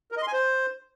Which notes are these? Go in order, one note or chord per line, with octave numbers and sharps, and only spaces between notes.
A#4
D#5
C6
G#5
C5